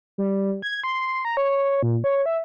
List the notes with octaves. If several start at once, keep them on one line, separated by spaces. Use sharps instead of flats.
G3
G#6
C6
A#5
C#5
A#2
C#5
E5